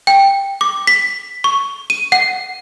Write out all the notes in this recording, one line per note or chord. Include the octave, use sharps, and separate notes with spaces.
G5
D6
B6
C#6
D#7
F#5